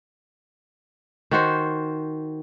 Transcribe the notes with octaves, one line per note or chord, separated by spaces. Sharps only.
D#3 F#4 C5